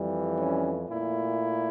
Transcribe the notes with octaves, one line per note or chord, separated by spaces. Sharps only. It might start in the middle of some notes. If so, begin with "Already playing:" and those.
Already playing: F2 E3 G3
C#4
A#2 A3 E4